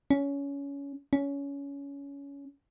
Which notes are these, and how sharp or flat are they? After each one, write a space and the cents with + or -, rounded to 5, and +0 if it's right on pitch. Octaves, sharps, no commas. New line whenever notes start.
C#4 +20
C#4 +20